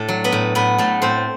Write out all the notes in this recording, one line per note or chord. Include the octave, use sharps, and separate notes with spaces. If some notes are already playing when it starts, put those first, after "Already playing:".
Already playing: A2 D4 A4
F#3
B3 B4
A2
A2 B3 B4
A2 A3 A4
A2 C4 C5